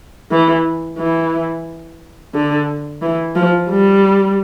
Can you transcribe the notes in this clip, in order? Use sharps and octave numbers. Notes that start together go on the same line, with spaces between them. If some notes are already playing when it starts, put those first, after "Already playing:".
E3
E3
D3
E3
F3
G3